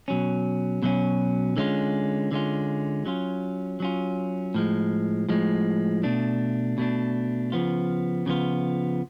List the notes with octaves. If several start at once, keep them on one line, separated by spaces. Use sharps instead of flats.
B2 F#3 C#4
B2 F#3 C#4
D3 G#3 C#4 F4
D3 G#3 C#4 F4
F#3 C#4 F4
F#3 C#4 F4
A2 F3 G#3
A2 F3 G#3
B2 A3 D4
B2 A3 D4
C#3 F3 B3 F4
C#3 F3 B3 F4